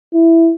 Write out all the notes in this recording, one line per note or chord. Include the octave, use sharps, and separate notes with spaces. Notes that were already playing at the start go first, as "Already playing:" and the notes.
E4